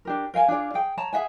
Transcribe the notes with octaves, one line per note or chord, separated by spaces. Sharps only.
D4 G4 A#4
A#4 F5 G5 G#5
D4 F4 G#4 D5
G#4 G5
C#5 A5 A#5
G#4 E5 F#5 G#5